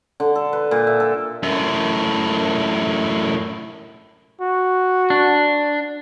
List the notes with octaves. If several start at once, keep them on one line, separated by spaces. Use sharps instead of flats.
D3
A4
B4
A#2
E5
A4
F#2 A2
F#4
D4